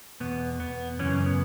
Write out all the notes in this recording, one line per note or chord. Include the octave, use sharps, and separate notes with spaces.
E2 B2 B3
B3
F#2 C#3 E3 C#4
B3